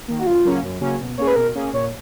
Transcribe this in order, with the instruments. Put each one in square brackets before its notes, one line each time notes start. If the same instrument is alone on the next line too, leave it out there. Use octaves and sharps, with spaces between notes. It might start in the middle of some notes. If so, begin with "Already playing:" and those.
[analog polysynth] D#3 A#3
[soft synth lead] F#4
[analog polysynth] F#2 [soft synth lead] F4
[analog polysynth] C#3 F#3 A#3 C#4
F#2
C#3 F#3 A#3 C#4
B2
[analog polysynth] A#3 C#4 G#4 [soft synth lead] C#5
[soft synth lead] B4
[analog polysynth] B2 [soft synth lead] A#4
[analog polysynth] A#3 C#4 G#4
[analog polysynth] A#2 [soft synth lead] C#5